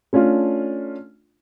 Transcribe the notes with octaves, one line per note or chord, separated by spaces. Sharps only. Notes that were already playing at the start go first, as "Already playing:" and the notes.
A3 C#4 D4 F4